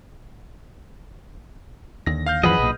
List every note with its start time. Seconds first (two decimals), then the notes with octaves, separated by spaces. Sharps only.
2.06 D#2 D3 A#6
2.26 F5 F6 G6
2.43 F#2 E3 F3 G#4 B4 D#5 F#5 B5
2.59 B1 A#2